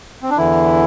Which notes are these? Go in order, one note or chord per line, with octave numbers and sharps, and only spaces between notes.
C4
D4
E2 D3 E3 E4